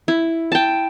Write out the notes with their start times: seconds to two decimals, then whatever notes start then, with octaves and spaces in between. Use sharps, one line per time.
0.08 E4
0.52 G5 A5